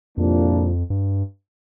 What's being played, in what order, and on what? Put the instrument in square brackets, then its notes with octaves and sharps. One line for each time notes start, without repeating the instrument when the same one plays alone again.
[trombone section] C2 A#2 F3 A#3 D4 [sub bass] F2
[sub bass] G2